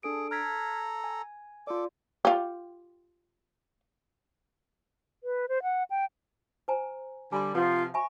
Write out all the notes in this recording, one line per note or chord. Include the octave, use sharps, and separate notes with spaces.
D4 G#4 A4 D7
A4 A#5 F6 G#6 B6
G#5
F4 A4 D5 D6
F4 G4
B4
C5
F#5
G5
C5 G#5 A#5
D3 G3 G#5 C6
C3 F3 F4 B4 F#5
E5 G#5 B5 C#6